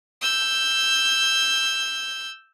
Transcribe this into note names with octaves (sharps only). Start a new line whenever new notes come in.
E6 G6